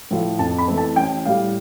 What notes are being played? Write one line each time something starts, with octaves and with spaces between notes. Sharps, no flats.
A2 F3
F2 A5
B5
E3 A3 C4
A5
A1 G5
A2 G3 F5